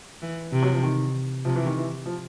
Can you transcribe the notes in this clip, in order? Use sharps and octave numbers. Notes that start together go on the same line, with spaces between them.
E3
C3
F#3
F3
D#3
C3 F3
E3
D#3
E3
F3